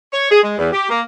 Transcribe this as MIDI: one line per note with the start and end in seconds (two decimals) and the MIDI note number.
0.13 0.29 73
0.31 0.41 68
0.43 0.53 56
0.58 0.72 40
0.73 0.88 67
0.89 1.01 58